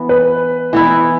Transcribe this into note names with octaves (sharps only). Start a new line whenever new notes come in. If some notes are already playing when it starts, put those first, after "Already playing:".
Already playing: E3 B3
B4
E3 B3 E4